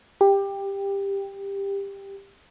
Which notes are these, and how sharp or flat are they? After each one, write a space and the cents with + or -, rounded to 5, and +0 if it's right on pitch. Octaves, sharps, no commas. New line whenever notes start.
G4 +15